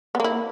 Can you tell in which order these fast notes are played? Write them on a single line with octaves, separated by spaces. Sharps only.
B3 A#3 E4